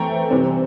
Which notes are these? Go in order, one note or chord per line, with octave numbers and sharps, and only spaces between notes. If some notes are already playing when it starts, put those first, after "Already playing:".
Already playing: E3 A3 C4 G5 A#5
C3 E3 G3 C4